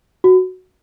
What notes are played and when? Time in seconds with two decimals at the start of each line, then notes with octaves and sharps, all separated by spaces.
0.24 F#4